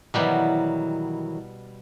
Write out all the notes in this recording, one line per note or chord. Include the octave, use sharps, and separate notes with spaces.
B2 D#3 E3 F#3 G3 B3